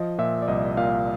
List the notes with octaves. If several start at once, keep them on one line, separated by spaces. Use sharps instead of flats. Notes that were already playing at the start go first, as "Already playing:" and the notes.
Already playing: F3 D#5
A#2 E5
D5
C2 D#5
A#2 F5